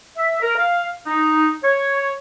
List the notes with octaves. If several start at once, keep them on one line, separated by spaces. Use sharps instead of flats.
E5
A#4
F5
D#4
C#5